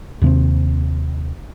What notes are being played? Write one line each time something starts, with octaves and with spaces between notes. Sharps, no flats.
D#2 C3 C4